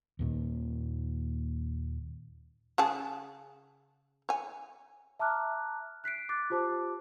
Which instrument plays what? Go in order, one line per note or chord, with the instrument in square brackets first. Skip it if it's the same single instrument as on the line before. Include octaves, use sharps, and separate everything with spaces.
[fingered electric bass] D#2 A#2 D#3
[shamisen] C#3 G#4 A5
C#5 G#5
[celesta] E5 A5 A#5 D6 F6 F#6
F#6 B6 C7 D7
D6 F#6 A6
F4 G4 C5 A5 D6